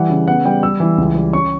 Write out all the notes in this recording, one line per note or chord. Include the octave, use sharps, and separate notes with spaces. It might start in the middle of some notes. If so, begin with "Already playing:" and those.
Already playing: E3 G3 F#5
C#3
B3 F#5
G3 G5
G3 E6
E3
C#2
G3
C#4 C#6